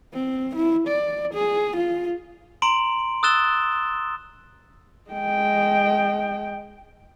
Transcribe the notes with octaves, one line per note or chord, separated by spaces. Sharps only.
C4
E4
D5
G#4
F4
A#5 C6 D7 F#7
D#6 E6 F#6 A6 E7 G7
G#3 G5